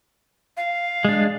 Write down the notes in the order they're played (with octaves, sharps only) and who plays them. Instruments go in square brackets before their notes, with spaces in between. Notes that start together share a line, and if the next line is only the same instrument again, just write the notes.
[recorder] F5
[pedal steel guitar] G#3 D4